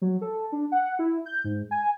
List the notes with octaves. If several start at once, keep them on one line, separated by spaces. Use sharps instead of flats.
F#3
A4
D4
F#5
E4
G6
G#2
G#5